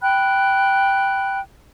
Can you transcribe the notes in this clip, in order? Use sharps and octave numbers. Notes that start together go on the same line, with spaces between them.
G5 B5 F#6